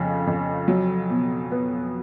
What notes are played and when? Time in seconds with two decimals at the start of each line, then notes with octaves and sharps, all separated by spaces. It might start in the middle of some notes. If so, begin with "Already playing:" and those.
Already playing: F2 C#3
0.27 F2
0.68 F#3
1.10 B2
1.51 B3